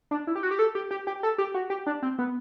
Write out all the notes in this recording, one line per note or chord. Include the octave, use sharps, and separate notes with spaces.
D4
E4
G4
F#4
G4
A4
G4
G4
G4
A4
G4
F#4
G4
D4
C4
B3